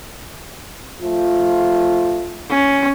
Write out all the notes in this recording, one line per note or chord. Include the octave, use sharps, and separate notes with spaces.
F3 A3 F4
C#4